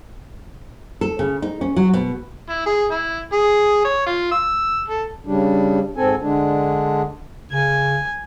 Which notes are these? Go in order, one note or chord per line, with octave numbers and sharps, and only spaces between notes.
A4
C#3
D#4
C#4
F#3
B2
E4
G#4
E4
G#4
C#5
F4
E6
A4
C#3 G3 D4
G#2 C4 A4 G#5
D3 G#3 D4
C#3 G#5